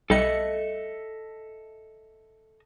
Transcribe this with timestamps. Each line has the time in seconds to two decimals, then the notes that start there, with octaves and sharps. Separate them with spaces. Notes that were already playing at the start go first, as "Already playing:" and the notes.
0.10 B1 G3 A4 D#5 E5 C#7